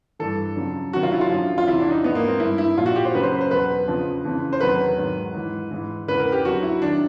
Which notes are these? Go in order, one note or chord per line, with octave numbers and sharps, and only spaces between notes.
G2 E3 A4
F2 C#3 F#3
F2 C3 D#3 F#3 F#4
F4
E4
F4
F#2 D3 F3
F4
E2 C3 E3 E4
D4
D#4
G#2 F3 B3
A#3
C4
G2 E3 E4
E4
A#2 F3 F4
F#4
G4
C5
F#2 C#3 F#3 B4
C5
B4
C5
E2 B2 F#3 B4
F2 C#3 F3
F2 C#3 E3
C5
E2 C3 D#3 F#3 B4
G#2 D#3 F#3
G#2 E3
G#2 E3
E2 C#3 E3 B4
A#4
G4
F2 D3 F#3 F#4
E4
D#3 F#3 D4